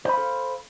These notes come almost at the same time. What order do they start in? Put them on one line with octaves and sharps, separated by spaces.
C5 B5 F5 A4